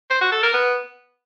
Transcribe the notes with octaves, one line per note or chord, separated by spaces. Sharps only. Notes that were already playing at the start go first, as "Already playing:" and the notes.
C5
F#4
A4
A#4
B3